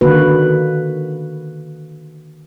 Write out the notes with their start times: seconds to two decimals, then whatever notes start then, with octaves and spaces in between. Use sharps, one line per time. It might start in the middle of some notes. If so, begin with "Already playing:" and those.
0.01 D3 D#3 A#3 F#4 B4